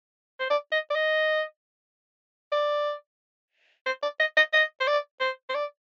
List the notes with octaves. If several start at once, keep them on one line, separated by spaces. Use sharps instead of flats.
C5
D5
D#5
D5
D#5
D5
C5
D5
D#5
D#5
D#5
C5
D5
C5
C5
D5